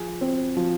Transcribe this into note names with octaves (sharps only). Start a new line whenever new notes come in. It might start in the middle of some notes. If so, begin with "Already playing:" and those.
Already playing: F3 G#4
C4
F3